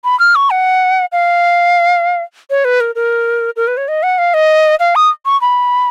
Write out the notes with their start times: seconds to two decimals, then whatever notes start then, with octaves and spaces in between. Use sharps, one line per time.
0.04 B5
0.20 F6
0.35 C#6
0.50 F#5
1.12 F5
2.50 C#5
2.65 B4
2.80 A#4
2.95 A#4
3.56 A#4
3.67 B4
3.77 C#5
3.88 D#5
4.03 F#5
4.18 F5
4.34 D#5
4.80 F5
4.96 D#6
5.26 C#6
5.41 B5